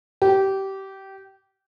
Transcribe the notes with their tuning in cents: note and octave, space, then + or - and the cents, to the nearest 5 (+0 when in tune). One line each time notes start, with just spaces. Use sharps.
G4 -20